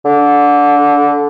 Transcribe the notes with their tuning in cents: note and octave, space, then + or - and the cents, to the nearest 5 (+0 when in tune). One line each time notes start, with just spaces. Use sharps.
D3 -20